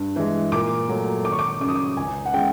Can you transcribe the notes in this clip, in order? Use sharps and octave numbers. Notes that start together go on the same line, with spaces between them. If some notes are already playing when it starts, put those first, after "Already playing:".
Already playing: G2
E3 G#3
A#2 D6
F#3 A3
G#1 D6
C#6
D6
F#2 C#3 D6 D#6
D6
C#2 G#5
F#5
C#3 E3 G#3 B3 G5